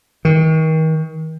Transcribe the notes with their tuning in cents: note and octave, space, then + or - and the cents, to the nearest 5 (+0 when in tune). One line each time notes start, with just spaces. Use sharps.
D#3 +35